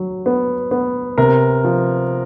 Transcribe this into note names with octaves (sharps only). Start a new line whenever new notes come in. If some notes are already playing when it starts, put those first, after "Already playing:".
Already playing: F#3
B3
B3
C3 A#4
F3